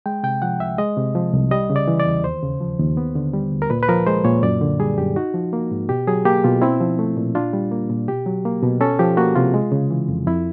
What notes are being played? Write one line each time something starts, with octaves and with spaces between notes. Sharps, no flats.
G#3 G5
C3 G5
F3 F#5
C2 E5
G#3 D#5
C3
F3
C2
G3 D#5
C#3
D5
E3
D5
E2
D#2 C5
C#3
F3
D#2
B3
D3
G3
D2
A#4
A#2 B4
B4
F3 A#4
G#3 C5
A#2 C#5
F#2 D5
D3
G3 G#4
F#2 G4
D#4 F#4
F3
A#3
G#2
B2 G4
F#3 G#4
A#3 G4
B2 F4
C4 E4
F3
A3
A#2
D4 F4
G3
A#3
A#2
B2 G4
F#3
A#3
B2
C#4 A4
F3 G4
A#3 F#4
C3 F4
G#3
C#3
E3
F2
F2 E4